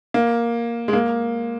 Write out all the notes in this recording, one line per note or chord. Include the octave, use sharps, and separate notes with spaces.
A#3
G#3
A#3